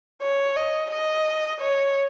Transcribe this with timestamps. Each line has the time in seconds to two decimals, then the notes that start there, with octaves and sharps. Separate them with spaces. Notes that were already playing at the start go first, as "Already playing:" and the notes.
0.22 C#5
0.56 D#5
0.91 D#5
1.61 C#5